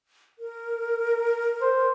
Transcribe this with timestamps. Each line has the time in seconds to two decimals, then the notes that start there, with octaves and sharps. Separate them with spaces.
0.39 A#4
1.62 C5